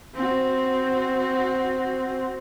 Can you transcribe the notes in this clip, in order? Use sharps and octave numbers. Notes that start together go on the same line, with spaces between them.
C4 F#4